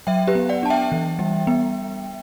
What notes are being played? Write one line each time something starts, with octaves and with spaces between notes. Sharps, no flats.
F#3 E5 G5
G4 B4
B3
D5 F#5
D4 A5
E5 G5
E3
G3
B3